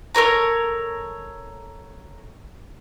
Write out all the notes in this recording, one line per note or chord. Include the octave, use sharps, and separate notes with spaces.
A4 A#4 C#5 A#5